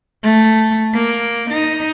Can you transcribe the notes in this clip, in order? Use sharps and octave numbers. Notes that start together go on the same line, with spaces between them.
A3
A#3
D#4